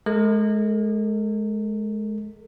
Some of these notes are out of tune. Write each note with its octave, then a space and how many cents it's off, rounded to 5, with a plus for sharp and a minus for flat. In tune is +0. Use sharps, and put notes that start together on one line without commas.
G#3 +30 A#4 -40